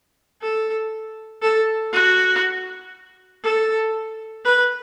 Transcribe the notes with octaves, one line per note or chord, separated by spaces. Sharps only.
A4
A4
F#4
A4
B4